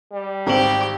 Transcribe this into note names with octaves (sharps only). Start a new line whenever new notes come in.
G3
G#1 C4 G4 F#7